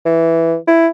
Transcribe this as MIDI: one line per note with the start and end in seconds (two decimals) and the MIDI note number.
0.06 0.56 52
0.68 0.88 64